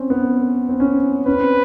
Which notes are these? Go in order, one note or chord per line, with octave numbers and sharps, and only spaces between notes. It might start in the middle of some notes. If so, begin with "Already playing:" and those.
Already playing: C4 C#4
B3
C4
C#4
C#4 B4
C4